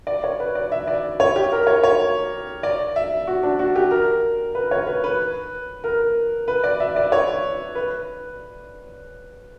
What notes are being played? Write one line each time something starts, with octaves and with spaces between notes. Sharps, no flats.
D5
C#5
B4
D5
E5
D5
C#5
G4
A#4
C#5
C#5
D5
E5
F#4
D4
F#4
G4
A#4
B4
C#5
B4
B4
A#4
B4
D5
E5
D5
C#5
B4